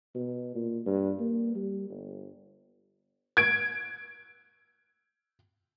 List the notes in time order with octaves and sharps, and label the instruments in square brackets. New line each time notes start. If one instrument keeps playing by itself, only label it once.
[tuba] B2
A#2
G2
A#3
G3
G1
[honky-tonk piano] G#6 D7